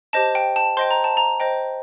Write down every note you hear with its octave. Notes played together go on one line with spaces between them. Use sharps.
G4 C5 D#5 A5
G5
A5
C5 D#5 G5 C6
A#5
A5
A#5
C5 D#5 G5